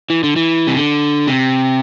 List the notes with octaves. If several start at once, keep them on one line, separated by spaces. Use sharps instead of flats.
E3
D3
E3
C3
D3
C3